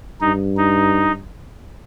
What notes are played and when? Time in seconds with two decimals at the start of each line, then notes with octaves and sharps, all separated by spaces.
0.21 G2 D#4
0.57 D#4